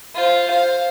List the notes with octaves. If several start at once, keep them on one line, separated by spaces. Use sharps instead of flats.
F4 C5
C5 F5